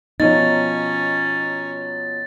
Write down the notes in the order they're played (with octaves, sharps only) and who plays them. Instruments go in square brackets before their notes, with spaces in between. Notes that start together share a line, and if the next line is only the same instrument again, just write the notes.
[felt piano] B2 F3 C#5 [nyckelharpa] C#4 A#5 [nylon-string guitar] D#4 [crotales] A6